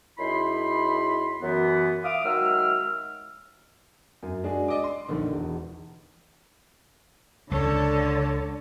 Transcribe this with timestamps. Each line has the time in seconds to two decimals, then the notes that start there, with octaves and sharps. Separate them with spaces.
0.18 F#2 D#4 E4 G#4 B5 C6
1.41 F#2 E3 B3
2.03 E5 F5 D6 D#6
2.24 D#3 F#3 G#3 E5 E6 F6
4.23 F#2
4.44 G#3 D4 F#4 G#4
4.68 D5 D#5 D6
4.84 C6
5.09 A#1 D3 D#3
5.32 E1
7.51 C#2 D3 A4 C#5